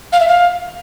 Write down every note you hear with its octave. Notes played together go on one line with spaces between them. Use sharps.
F5
E5
F5